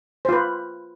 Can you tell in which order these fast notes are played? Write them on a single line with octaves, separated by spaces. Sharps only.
C5 F4 B4